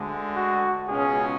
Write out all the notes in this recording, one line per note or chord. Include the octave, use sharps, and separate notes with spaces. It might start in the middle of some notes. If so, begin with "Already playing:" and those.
Already playing: D2 D3 G#3
F#4
C#2 B2 G#3 C#4 G#4